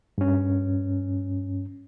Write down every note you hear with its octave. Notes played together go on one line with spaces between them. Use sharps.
G2 C#4